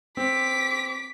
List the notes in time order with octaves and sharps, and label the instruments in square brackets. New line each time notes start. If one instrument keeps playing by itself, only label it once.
[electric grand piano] C4 [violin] D6 B6